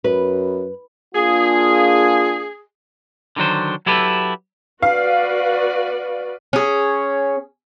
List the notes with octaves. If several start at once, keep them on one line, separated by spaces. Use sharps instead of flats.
F#2 B4
A#3 D4 F4 G#4
D3 D#3 F#3 D4 C5
F#3 E4 G4 A4 B4
F#4 B4 D5 F5
C#4 G#4